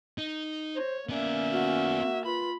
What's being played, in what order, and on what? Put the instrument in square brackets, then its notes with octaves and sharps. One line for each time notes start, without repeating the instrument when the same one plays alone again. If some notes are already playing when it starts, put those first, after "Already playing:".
[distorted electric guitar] D#4
[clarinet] C5 [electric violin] C#5
[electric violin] A#3 E5 [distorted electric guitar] B3 D5 [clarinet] C#4
[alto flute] F#4
[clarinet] F4 [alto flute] B4 [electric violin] B5